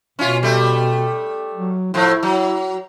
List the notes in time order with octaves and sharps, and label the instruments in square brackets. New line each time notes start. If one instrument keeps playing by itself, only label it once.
[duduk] B2 [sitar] C#4 F4
[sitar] G3 A3
[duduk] F#3
[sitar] A2 F3 [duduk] E4
[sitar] F#3